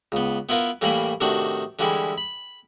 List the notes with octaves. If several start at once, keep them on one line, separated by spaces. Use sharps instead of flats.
C#2 B3
B3 E4 F4 A#4 B4
A2 E3 G3 A#3 A#4 B5
A2 C3 D#3 D4 F#4
D3 E3 G3 G#3 E4 G4
B5